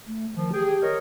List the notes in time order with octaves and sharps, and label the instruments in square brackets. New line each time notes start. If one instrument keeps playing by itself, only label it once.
[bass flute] A3
[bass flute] D#3 [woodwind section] F3
[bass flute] G4 [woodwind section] G#4 G5
[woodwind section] A#4 C#5 D#5